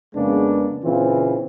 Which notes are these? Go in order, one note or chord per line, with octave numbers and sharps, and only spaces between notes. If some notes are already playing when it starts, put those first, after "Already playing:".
F2 C#3 G#3 A#3 B3 D4
A#2 C#3 E3 C4 F4